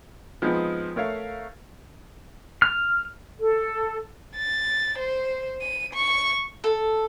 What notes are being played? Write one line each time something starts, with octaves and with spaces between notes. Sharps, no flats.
F3 G#3 B3 C4 D#4
A3 A#4 C#5 E5 F5
F6
A4
A6
C5
D#7
C#6
A4